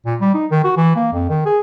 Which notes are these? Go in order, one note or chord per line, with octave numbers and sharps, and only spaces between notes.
A#2
G3
D#4
D#3
F#4
E3
A#3
F2
D#3
G#4